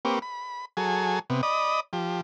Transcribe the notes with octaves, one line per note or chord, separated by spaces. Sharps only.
A#3 C4 G4 B4 C#6
B5
F#3 G#4 A4 G#5
C3 B3
D5 D#5 B5 D#6
F3 G4